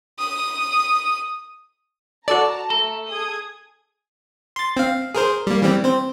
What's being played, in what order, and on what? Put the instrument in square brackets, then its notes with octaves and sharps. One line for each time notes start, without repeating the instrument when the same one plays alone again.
[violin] D#6
[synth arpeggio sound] F#4 A4 D6 [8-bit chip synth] D5 [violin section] A5 A#5
[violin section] A3 [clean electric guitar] A4 [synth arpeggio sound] A#5
[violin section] G#4 D#6 G#6
[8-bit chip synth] C6 A6
C4 F5
G#4 A#4 C5
G3 A#3
E3 G3 C4
C4 C5